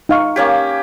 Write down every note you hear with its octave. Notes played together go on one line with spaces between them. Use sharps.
D#4 F5 C#6
A#3 C#4 G4